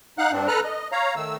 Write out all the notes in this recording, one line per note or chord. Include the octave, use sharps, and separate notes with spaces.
D#4 F5 F#5 F#6
G2 C4 D4
A4 B4 A#5 F6 F#6
D#5
C#5 F5 A#5
D#3 A3 E6